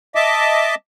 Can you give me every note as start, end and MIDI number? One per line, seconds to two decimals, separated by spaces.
0.15 0.75 75
0.15 0.75 76
0.15 0.75 81
0.15 0.75 86